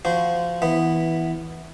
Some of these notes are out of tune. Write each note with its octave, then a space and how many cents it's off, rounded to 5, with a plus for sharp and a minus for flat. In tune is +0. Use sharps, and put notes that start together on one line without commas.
F3 -15 F#4 -10 C5 -20
E3 -10 B3 +0